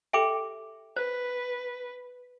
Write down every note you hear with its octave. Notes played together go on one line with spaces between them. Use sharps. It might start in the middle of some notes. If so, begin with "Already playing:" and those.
G4 A4 E5 G5 D6 D7
B4 C5